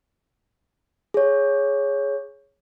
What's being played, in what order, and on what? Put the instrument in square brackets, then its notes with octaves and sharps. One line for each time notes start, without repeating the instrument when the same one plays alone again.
[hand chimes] G#4 C#5